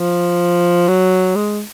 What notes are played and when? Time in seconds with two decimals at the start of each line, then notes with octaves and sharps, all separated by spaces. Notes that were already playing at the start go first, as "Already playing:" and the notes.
Already playing: F3
0.88 F#3
1.36 G#3